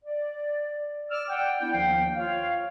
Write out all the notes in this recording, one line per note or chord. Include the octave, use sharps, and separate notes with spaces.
D5
D5 E6 F6
D5 F#5 G5
B3 D4 E4 G5
D#2 D#3 F3 F5 G5
F4 C#5 F5